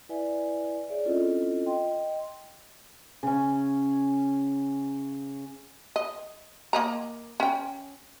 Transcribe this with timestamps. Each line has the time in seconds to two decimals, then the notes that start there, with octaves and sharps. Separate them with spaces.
0.09 E4 B4 D5 E5 G#5
0.89 G#4 C#5 D5 E5
1.05 C4 C#4 E4 F4 A4 D#5
1.66 D#5 G5 C6
3.23 C#3 C#4
5.96 D#5
6.73 A#3 D#5 A#5
7.40 C#4 G5